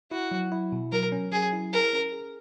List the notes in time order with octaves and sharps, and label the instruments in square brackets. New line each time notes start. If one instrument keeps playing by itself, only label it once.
[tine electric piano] E4 [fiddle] F#4
[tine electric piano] F#3
E4
B2
[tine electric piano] F#3 [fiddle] A#4
[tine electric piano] C#4
[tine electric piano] F#3 [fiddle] G#4
[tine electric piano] E4
[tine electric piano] G#4 [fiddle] A#4
[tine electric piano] C#4
G#4